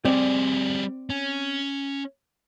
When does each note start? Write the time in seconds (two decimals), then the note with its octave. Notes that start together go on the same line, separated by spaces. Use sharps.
0.05 G3 C4 G#4 C5 D5
1.10 C#4